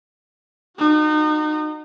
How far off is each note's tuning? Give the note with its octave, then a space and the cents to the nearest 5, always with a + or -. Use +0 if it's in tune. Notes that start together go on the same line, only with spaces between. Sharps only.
D#4 -30 F#4 -15